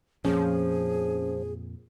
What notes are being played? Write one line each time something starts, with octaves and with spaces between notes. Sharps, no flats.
F2 A#2 F3 C#4 G#4